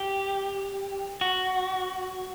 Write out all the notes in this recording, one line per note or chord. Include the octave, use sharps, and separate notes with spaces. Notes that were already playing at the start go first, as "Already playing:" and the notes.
Already playing: G4
F#4